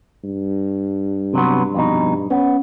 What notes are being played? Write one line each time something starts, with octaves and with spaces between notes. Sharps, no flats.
G2
C3 F#3 B3
F2 B2 D#4
B3 C#4